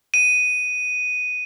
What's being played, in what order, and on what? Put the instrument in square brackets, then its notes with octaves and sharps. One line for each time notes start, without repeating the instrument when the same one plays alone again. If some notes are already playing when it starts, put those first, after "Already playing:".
[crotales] D#7